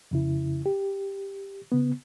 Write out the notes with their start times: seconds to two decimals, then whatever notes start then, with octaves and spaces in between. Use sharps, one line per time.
0.11 F2 C#3 E4
0.66 G4
1.72 C#3 B3